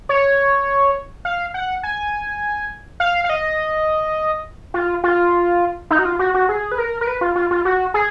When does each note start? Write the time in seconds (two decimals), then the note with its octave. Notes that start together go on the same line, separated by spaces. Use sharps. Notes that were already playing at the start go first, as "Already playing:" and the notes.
0.09 C#5
1.25 F5
1.54 F#5
1.83 G#5
3.00 F5
3.24 F5
3.30 D#5
4.74 F4
5.04 F4
5.91 D#4
5.99 F#4
6.05 F4
6.19 F#4
6.34 F#4
6.49 G#4
6.72 B4
6.78 A#4
7.01 A#4
7.07 B4
7.21 F4
7.36 F4
7.51 F4
7.65 F#4
7.94 G#4